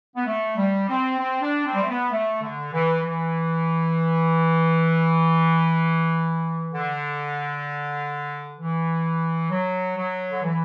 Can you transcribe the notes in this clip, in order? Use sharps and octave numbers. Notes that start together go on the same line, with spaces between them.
B3
A3
G3
C4
C4
D4
C4
G3
A3
B3
A3
D3
E3
E3
D3
E3
F#3
F#3
D3
E3